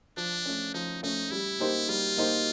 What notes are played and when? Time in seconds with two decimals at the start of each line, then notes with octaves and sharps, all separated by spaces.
0.17 F3 D4
0.46 A3 C#4
0.74 F3 D#4
1.03 A3 C#4 D#4
1.31 G3 E4
1.59 A#3 D#4 G4 C5
1.89 G3 F4
2.17 A#3 D#4 G4 C5